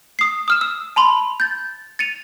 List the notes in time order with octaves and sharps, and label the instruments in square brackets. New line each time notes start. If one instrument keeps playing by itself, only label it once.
[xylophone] D#6 C7
D#6 F6 E7
E6
A5 B5 C6
G6 A6
A6 C#7 D#7 F7